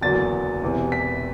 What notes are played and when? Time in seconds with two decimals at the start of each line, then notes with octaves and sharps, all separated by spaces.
0.01 F#1 E2 D3 F#3 A6
0.62 E1 E2 C3 E3
0.92 B6